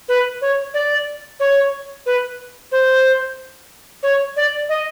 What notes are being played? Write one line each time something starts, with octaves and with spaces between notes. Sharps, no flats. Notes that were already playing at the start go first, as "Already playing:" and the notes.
B4
C#5
D5
C#5
B4
C5
C#5
D5
D#5